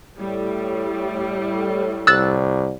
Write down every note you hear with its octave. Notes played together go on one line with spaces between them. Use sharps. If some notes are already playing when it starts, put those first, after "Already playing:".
A2 G3
C2 E6 F#6 A6